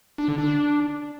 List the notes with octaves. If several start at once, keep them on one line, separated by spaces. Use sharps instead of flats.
D4
D3
D4